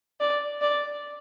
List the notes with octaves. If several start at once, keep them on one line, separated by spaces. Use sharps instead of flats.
D5
D5